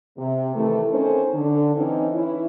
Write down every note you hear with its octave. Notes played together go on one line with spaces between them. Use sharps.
C3
C3 D#3 E3 A3
C4 C#4 D#4 A4 A#4 C5
D3
E3 C4 C#4 D#4
E3 C#4 E4